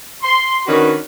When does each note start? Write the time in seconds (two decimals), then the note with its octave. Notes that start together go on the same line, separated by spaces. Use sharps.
0.22 C6
0.66 D#3 C#4 D4 F#4 B4